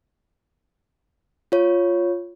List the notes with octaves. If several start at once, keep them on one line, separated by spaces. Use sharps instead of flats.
F4 C#5